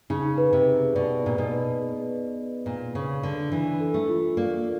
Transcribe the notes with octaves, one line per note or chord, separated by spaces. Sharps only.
C#3 D#4
B4
C3
G#4
B2 D5
A#2 D#4
B2
B4
G#4
D5
D#4
A#2 B4
C#3 G#4
D3 D5
E3 D4
A4
A3
F4
A#3 D5